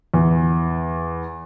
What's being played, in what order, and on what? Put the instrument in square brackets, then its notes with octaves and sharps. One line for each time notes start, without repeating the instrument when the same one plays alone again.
[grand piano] E2